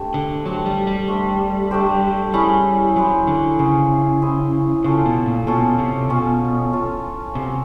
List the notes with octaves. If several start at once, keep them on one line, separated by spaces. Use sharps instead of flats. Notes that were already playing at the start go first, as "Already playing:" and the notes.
Already playing: A3 D4 G4 C5
D3
F#3 A3 D4 G4 C5
G3
G3
A3 D4 G4 C5
A3 D4 G4 C5
G3 C#4 E4 G#4 C5
F#3 C#4 E4 G#4 C5
D3
C#3 C#4 E4 G#4 C5
C#4 E4 G#4 C5
C#3 C#4 F4 A4
B2
A#2
B2 C#4 F4 A4
C3
B2 C#4 F4 A4
C#4 F4 A4
C3 C#4 F#4 A#4